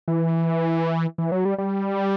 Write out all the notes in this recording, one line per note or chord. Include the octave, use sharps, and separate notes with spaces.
E3
E3
F#3
G3
G3